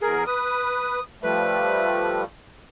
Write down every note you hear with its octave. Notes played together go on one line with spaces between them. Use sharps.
E2 G#4 A#4
B4 D#6
F3 G3 A3 B4